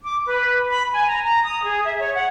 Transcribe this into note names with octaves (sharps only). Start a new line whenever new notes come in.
D6
B4
B5
G#5
A#5
A#5
D#6
G#4
E5
C#5
F#5